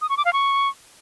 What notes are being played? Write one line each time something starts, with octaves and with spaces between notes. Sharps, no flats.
D#6
C#6
D6
F5
C#6